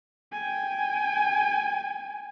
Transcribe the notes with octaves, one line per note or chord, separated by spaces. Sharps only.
G5 G#5